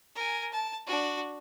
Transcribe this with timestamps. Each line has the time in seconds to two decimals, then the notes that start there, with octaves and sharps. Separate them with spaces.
0.15 A#4 G#5
0.52 A5
0.86 D4 F#4